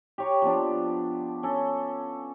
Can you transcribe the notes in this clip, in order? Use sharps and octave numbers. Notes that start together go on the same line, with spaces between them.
G4 C#5 A#5
F3 B3 D4
C#4 A4